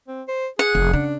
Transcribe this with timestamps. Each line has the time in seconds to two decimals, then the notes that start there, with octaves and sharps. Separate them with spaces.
0.08 C4
0.28 C5
0.59 G#4 F#5
0.75 F1
0.93 C#3 D4